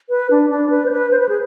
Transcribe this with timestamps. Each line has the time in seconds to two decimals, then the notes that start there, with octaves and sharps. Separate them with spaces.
0.09 B4
0.31 D4
0.50 D4
0.70 B4
0.86 C5
0.91 B4
1.11 C5
1.19 B4
1.29 G#4